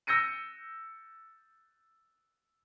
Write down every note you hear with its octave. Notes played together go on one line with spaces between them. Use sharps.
E6 G6 A#6 C#7 D#7